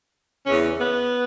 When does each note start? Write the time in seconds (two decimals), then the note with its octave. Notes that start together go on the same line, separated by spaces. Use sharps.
0.47 E2 C#3 E3 C#4
0.79 B3